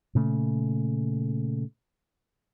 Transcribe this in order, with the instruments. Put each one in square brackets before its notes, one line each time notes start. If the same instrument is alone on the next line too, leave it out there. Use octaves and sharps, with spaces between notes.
[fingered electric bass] A#2 C#3 A3